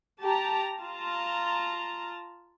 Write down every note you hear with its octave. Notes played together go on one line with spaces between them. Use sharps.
G4 A5 A#5
F4 A5 A#5